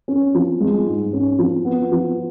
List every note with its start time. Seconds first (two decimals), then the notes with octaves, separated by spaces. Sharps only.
0.08 C#4
0.35 F3
0.60 G#3
0.87 G#2
1.13 C#4
1.39 F3
1.65 B3
1.92 F3